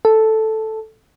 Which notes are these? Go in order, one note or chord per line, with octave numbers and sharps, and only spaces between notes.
A4